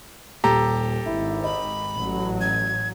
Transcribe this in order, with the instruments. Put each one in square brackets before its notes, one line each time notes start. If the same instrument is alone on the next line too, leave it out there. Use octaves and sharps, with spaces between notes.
[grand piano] D#1 [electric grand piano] G4 A4 A#5
[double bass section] G#1 [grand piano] E4
[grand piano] D#5 [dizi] B5
[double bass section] A1 F#3
[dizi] G#6